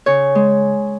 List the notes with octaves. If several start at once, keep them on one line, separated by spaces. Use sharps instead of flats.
C#3 C#5
G#3